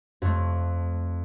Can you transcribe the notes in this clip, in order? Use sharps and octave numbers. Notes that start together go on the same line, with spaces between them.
F2 A3